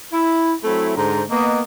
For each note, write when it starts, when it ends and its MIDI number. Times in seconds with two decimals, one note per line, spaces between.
0.13 0.54 64
0.64 0.96 54
0.64 0.96 57
0.64 0.96 60
0.64 0.96 64
0.96 1.24 44
0.96 1.24 50
0.96 1.24 72
0.96 1.24 82
1.30 1.62 58
1.30 1.62 59
1.30 1.62 75